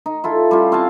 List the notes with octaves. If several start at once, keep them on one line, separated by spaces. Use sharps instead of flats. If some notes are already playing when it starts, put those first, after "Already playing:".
D#4
E4 F4 A4
G3 C#4 F4
C4 F5 G#5 A5